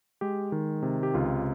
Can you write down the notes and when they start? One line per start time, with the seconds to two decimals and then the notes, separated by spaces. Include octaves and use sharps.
0.21 G#3 G4
0.52 D#3
0.82 C3
1.03 G4
1.14 C#2 F4